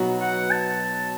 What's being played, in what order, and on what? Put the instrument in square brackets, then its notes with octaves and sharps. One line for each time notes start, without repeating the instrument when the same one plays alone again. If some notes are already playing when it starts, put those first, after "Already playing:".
Already playing: [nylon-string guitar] B2 F#3 B3 D#4 F#4
[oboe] F#5
A5